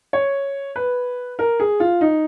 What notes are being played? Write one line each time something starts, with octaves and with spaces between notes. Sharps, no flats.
C#5
B4
A#4
G#4
F4
D#4